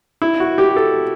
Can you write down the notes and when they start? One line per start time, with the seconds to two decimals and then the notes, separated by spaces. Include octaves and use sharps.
0.22 E4
0.40 F#4
0.58 G4
0.76 A4